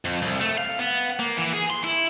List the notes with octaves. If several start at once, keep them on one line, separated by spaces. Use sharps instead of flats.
F2
C2
A3
F5
B3
A#3
E3
G#4
C6
E4